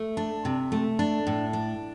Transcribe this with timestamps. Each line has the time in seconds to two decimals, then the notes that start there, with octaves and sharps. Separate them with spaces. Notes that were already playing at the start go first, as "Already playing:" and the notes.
Already playing: A3
0.17 D4
0.45 C3
0.72 A3
0.99 D4
1.27 A2
1.53 D4